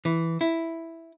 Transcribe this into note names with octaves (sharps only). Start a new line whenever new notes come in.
E3
E4